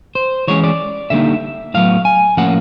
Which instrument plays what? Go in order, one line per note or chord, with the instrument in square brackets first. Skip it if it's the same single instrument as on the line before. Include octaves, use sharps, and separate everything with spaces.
[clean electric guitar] C5
E3 G#3 C#4 C#5
D5
D3 G3 A#3 D#4 E5
A2 F#3 B3 F5
G#5
A2 F3 A#3 C#4 F#5